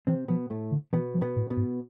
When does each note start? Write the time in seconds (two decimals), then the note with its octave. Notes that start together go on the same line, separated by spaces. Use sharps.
0.07 C3 E3 C4
0.28 B2 F3 B3
0.50 A2 A3
0.71 D3
0.93 B2 E3 B3
1.14 F3
1.21 B2 B3
1.36 A2
1.50 B2 B3
1.57 G#2